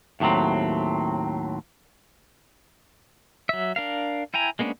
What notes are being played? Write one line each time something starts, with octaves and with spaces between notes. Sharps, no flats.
D#2 A2 D3 F#3 C4
F#3 E5
D4 A#4 F5
E4 G5 G#5 A#5
G#3 A#3 B3 C#4 D4